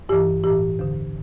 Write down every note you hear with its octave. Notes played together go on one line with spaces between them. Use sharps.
G2 E3 G4
A2 E3 G4
E2 D3